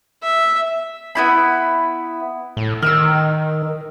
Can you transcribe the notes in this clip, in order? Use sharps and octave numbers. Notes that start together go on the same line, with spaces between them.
E5
B3 E4 B5
A2
D#3 A#4 E6